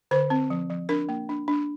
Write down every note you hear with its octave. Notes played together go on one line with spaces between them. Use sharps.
D3 C5
C4
F3
F3
D4 A#4
A#3
D4
D4